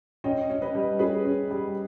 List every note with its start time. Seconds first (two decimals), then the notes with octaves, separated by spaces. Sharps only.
0.24 C#4 D#5 G5
0.50 C#4
0.61 B4 D#5
0.75 G3
0.99 C#4 G#4 B4
1.25 C#4
1.51 G3